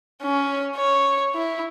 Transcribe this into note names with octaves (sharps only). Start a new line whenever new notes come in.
C#4
C#5
E4